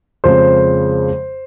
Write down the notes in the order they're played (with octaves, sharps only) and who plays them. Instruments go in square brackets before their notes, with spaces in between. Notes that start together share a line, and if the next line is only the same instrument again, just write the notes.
[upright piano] F2 C#3 G#3 C5